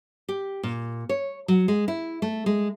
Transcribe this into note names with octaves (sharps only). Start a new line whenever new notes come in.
G4
A#2
C#5
F#3
G#3
E4
A3
G#3